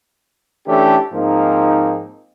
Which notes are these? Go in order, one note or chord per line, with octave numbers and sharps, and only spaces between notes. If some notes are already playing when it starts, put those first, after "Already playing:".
E3 A3 C#4 D4 G4 A4
G#2 F3 A#3 C4 D#4